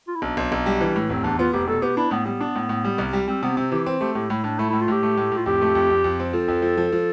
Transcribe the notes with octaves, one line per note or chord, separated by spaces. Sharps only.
F4
E4
B1 D4
B1
B1
G3
E3
A2
F1 C4
E2 D4
B3 F4
F1 G4
B2 A4
B3 G4
D4 E4
A2 B3
G3 B3
D4
A2
A2
G3
C2
G3
G3 C4
C3 B3
C3 C4
E3 G4
C4
A3 G4
A2 G4
A2 E4
A2 D4
A3 E4
A2 E4
F4
A2 G4
A3
A2
A2
F4
F2 G4
A3
F2
F2
F2
C4
F3 A4
F2
F3
F3
F3